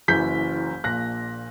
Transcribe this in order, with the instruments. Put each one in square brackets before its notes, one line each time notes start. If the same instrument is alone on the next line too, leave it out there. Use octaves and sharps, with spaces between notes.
[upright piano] F#1 F#2 E3 G6 B6
A#1 A#2 F#6 A#6